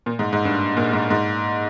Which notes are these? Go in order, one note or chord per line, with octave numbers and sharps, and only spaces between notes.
A#2
G#2
G#2
G2
A#2
G#2
G#2